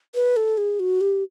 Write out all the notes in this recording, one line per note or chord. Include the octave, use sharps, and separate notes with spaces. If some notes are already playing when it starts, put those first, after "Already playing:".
B4
A4
G#4
F#4
G4